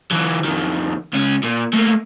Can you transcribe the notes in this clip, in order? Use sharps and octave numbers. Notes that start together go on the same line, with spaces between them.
E3 F#3
F2 D#3
C#2 C#4
A#2
A3 A#3